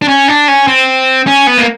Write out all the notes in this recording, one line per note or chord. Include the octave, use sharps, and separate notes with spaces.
D4
C#4
D4
C#4
C4
C#4
B3
A#3